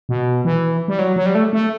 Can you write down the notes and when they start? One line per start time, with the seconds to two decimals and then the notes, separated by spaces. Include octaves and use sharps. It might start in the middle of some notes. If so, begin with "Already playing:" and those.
0.09 B2
0.45 E3
0.88 G3
0.99 F#3
1.16 F#3
1.26 G3
1.35 A3
1.53 A3